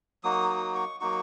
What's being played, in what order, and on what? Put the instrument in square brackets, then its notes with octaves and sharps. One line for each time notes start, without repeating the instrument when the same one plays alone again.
[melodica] F#3 A#3 D#4 F#4 D#6
D#6
C#6
F#3 A#3 D#4 F#4 C#6